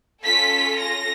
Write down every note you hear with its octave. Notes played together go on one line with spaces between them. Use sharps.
C#4 F4 A4 B6
A#6